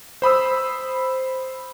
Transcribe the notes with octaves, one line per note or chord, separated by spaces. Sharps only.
C5 B5 D#6 E6